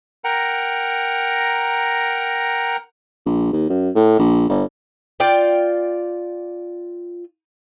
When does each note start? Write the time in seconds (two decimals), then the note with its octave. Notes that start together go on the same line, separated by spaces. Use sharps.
0.24 A#4 F#5 G5 A#5
3.26 A#1
3.53 D#2
3.69 F#2
3.95 A2
4.19 A#1
4.49 G1
5.20 F4 D5 G5